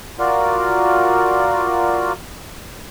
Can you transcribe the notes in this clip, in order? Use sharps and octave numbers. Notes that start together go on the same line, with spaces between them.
F4 F#4 A#4 D5